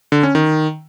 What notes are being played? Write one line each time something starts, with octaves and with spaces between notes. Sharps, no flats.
D3
C#4
D#3